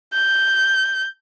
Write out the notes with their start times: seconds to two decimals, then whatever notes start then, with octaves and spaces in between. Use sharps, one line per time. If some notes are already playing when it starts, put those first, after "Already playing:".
0.13 G6